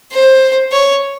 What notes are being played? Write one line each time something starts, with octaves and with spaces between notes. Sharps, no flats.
C5
C#5